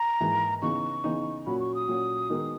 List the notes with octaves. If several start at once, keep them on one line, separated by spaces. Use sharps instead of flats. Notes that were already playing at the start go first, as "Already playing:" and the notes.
Already playing: A#5
G#2 E3 A#3 E4
C#3 E3 B3 D#4 C#6
C#3 E3 B3 D#4
A#2 F#3 C#4 F#4 B5
C#6
D#6
A#2 F#3 C#4 F#4
D#3 G#3 B3 D#4 F#4